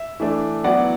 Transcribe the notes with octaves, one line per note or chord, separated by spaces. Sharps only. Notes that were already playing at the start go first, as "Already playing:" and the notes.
Already playing: E5
E3 A3 D4
F#3 B3 E4 D5 F#5